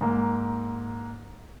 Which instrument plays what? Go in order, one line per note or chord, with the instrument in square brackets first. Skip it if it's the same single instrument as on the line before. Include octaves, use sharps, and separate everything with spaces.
[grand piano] G#2 A#3